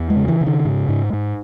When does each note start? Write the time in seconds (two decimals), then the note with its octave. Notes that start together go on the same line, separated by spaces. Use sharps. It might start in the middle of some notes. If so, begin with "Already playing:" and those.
Already playing: E2
0.10 G#3
0.16 C#3
0.28 E3
0.41 C#3
0.46 D#3
0.65 G#2
0.89 G#2
1.13 G#2